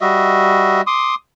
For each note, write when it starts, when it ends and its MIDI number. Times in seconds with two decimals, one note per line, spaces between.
0.01 0.81 55
0.01 0.81 66
0.01 0.81 75
0.01 0.81 76
0.87 1.15 84
0.87 1.15 86
0.87 1.15 87